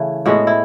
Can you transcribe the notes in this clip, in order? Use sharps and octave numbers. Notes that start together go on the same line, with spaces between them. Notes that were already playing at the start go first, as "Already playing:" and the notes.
Already playing: C#3 E3 A3 E4
A2 G#3 B3 F#4
E4